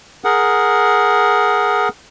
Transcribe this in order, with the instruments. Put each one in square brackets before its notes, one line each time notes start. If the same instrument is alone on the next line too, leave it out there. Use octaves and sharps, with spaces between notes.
[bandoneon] G#4 A#4 F#5